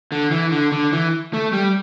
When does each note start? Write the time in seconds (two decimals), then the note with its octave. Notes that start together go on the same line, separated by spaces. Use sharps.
0.12 D3
0.31 E3
0.52 D3
0.72 D3
0.93 E3
1.33 A3
1.53 G3